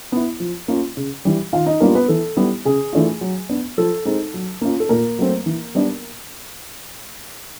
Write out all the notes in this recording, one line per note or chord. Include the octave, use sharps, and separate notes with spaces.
B3 E4
F3
A#3 C#4 F4
C#3
E3 G3
D#3 F4 F5
D#4 D#5
G3 A#3 B3 D4 F4 A#4
B3 B4
E3 A4
G3 B3 E4
C#3 G#4
E3 A3 D4 F4
F#3
B3 D4
F3 A4
G#3 C4 D#4
F#3
A#3 C#4 F4
A4
A#2 A#3 A#4
F#3 A3 C4
E3
G3 B3 D4